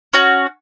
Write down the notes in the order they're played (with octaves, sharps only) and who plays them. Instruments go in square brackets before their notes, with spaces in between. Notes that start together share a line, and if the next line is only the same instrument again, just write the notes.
[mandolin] C#4 F#4